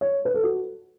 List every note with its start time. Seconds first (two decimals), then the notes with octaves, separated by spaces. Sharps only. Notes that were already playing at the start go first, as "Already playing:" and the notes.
0.01 C#5
0.25 B4
0.34 A4
0.43 F#4